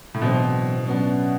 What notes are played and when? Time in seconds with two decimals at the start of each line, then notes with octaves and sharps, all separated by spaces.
0.14 A2
0.21 E2 B2 D3 F#3 C4
0.87 F#2 F#3 B3 D4